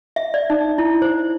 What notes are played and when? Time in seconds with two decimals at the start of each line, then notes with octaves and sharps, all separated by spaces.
0.16 E5
0.34 D5
0.50 D#4
0.78 E4
1.02 C5